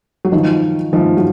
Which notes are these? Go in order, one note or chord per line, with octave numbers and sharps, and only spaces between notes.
F#3
D#3 F3
D#3 F3
F#3